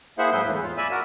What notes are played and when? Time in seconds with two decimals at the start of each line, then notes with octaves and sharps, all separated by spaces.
0.18 A#3 E4 G#4 C5 E5 F#5
0.32 G#2 F#3 E4 G#4 B4 G6
0.45 E2 A2
0.62 F4
0.77 D5 E5 G#5 B5 E6
0.91 F#4 A#4